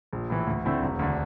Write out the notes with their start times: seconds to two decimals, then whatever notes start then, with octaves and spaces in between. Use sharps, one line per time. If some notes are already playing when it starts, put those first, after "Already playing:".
0.13 A#1
0.30 A2 E3
0.47 D2
0.65 D3 A3 C4 E4
0.82 E1
0.99 D2 D3